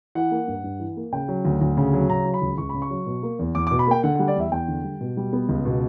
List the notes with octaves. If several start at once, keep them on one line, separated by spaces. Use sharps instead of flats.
E3 F#5
A#3
G2
G2
E3
A#3
C#3 G5
F#3
D2
D2
C#3
F#3
C#3 A#5
F#3
B5
C#2
C#2 C#6
C#3 B5
C#6
F#3
B2
A#3
E2
E2 D6
D6
B2
B5
A#3 G5
D3 F#5
F#5
G3
D5
E2 E5
E2 G5
D3
G3
B2
G3
B3
C#2
B2